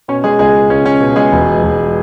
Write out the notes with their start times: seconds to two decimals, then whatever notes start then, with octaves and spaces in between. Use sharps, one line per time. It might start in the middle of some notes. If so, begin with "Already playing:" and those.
0.08 B2 C#4 C#5
0.24 G#3 G#4
0.39 C#2 G#3 G#4
0.70 C#2 C#4
0.86 C#4
1.01 B2
1.16 G#3 G#4
1.32 E1
1.63 E1